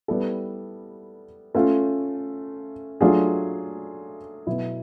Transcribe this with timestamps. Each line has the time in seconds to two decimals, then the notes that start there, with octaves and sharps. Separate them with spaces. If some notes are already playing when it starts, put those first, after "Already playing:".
0.08 G3 B3 E4 A4
1.55 A3 C#4 F4
3.01 F#3 A3 D4 F4 G#4
4.47 B2 F#3 B3 E4